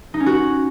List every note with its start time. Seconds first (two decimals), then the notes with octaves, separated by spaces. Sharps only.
0.14 D#4
0.20 C#4
0.26 F#4